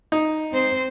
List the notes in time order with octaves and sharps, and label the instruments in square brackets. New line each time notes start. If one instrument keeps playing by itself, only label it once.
[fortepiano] D#4
[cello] C4 C5